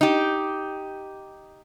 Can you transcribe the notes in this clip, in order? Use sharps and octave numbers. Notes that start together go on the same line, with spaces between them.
D#4 G4